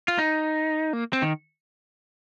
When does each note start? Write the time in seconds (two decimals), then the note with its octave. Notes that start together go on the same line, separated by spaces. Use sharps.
0.08 F4
0.18 D#4
0.93 A#3
1.13 C4
1.22 D#3